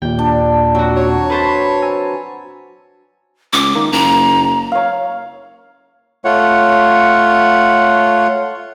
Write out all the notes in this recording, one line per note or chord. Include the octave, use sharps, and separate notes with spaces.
D#2 A#2 G5
D4
F#3 C4 F#4
C#5
B4 C5 A5
G#5 A#5 E6
C#2 D6
D#3 A#3
F#1 A#5
C#5 F5
A3 F4 C#5 F#5